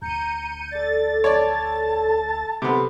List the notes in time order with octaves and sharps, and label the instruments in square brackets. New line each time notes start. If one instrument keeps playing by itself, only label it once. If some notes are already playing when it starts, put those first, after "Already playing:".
[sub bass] D2 [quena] A#5 [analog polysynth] G6 C#7 D#7
[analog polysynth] A4 A6 [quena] D5
[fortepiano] C#5 D5 [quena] A5
[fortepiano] C3 B3 [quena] A4